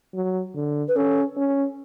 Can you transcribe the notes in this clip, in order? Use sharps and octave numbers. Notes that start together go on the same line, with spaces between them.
F#3
D3
B4
C#4 A4
C#4